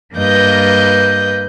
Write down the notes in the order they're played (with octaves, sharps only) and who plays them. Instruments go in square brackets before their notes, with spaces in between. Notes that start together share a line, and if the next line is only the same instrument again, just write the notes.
[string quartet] G2 A#3 B4 D#5 G6